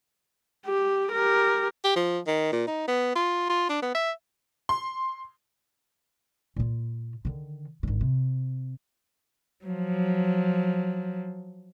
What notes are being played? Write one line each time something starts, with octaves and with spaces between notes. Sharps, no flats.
G4
G4 A#4
G4
F3
D#3
A#2
D#4
B3
F4
F4
D4
B3
E5
C6
A#2 F4
D3 D#3
G#1 D3
C3
F3 F#3